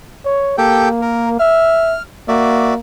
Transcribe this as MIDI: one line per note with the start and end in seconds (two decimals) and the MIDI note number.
0.25 0.55 73
0.58 1.37 58
0.58 0.89 67
0.58 0.89 69
0.58 0.89 79
1.02 1.29 70
1.39 1.97 76
1.39 2.02 89
2.28 2.79 58
2.28 2.74 66
2.28 2.74 74
2.28 2.74 76